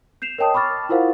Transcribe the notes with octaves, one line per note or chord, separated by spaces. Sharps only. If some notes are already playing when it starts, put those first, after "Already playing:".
G6 C7 E7 F7
A#4 C#5 D#5 G5 A5 D#6
B5 C#6 D6 F6 A6
E4 F4 A#4 C5 F5 F#5